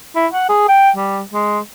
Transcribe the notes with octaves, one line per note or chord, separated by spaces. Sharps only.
E4
F#5
G#4
G5
G3
G#3